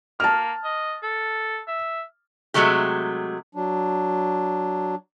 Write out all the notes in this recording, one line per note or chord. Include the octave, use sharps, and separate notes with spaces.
A#3 A5 F6
D#5
A4
E5
C3 D#3 F#3 G#3 A3 G4
F#3 D4